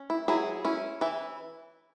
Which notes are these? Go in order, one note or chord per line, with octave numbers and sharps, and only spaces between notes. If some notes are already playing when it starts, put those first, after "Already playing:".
Already playing: C#4
E4
F#3 E4 G#4
C#4 E4
E3 E4